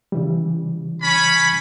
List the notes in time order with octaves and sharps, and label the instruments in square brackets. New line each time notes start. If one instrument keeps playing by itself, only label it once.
[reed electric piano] C#3 E3 G3
[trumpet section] C#4 B5